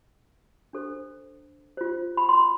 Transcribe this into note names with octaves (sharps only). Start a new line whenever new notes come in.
D4 A4 C5
F4 C5
B5
C6